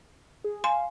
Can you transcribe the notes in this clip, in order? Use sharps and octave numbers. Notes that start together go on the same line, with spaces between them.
G#4
F5 G#5 C6